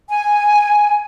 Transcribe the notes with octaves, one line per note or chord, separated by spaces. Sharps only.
G#5